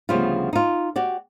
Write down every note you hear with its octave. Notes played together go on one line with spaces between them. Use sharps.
D2 C#3 F3 G3 B3 F4
D#4 F4
F#4 G4 D5